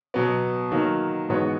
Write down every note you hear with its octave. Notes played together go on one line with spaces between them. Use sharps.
B2 F#3 B3
D#3 F#3 A#3
G#2 E3 B3 F#4 C#5